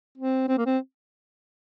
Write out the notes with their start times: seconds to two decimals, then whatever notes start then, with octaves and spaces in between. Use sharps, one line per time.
0.18 C4
0.48 C4
0.58 A#3
0.66 C4